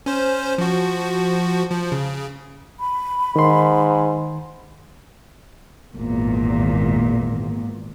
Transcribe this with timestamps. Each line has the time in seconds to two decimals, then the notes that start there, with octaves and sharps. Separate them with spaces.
0.06 C#4 C5
0.58 F3 F#4
1.71 F3
1.92 C#3
2.80 B5
3.36 G#2 D#3 C6
5.93 G#1 E2 A#2